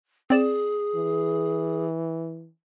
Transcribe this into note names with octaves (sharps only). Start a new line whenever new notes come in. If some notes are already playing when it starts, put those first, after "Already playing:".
C4 G#4 D5 E7
E3